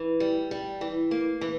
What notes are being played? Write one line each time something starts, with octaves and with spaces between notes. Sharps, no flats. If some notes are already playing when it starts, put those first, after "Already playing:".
Already playing: E3
G3
G3
E3
A#3
E3